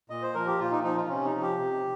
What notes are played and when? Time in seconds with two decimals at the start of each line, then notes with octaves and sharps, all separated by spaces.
0.10 A#2 D#5
0.22 C5
0.34 F3 A#4
0.47 G4
0.59 A#2 F4
0.71 D#4
0.84 F3 D#4
0.96 F4
1.08 C3 C#4
1.25 D#4
1.33 F3
1.42 G4
1.58 C3